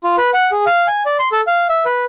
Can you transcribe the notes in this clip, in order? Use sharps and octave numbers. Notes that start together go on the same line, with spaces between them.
F4
B4
F#5
G#4
F5
G#5
D5
C6
A4
F5
E5
B4